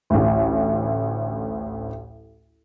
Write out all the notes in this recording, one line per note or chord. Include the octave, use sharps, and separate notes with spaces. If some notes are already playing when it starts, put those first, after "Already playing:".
A1 D2